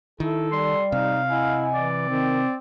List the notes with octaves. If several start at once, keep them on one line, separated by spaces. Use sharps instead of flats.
D#3 E4 A4
G3 G4 D5 C6
C3 D#4 F5
E4 D#5 F#5 G#5
E3 D5
D#3 C4